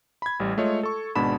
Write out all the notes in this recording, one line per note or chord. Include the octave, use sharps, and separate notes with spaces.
B5 G#6
A1 G3
G#3 A3 F4 C#5 D#5
A4 C#6
G#1 B2 G#3 D4 B5 E7